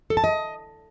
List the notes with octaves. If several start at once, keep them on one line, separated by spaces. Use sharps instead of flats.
A4
A5
D#5